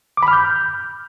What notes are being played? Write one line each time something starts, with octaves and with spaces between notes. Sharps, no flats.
D6
B5
F6
G6